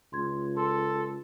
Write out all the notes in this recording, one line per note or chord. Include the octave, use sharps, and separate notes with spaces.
C#2 C6 G#6
A4 C6